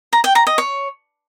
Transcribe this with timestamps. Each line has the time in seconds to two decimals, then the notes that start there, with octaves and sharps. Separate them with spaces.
0.13 A#5
0.24 G5
0.35 A#5
0.47 D#5
0.58 C#5